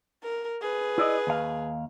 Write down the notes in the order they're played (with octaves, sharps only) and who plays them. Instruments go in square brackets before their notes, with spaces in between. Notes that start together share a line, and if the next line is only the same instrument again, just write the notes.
[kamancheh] A#4
G#4 B4
[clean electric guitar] E4 D5 D#5
D#2 F5